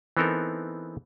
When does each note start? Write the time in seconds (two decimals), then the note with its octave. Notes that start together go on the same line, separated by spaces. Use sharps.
0.17 E3 B3 C4 D#4 A4 A#4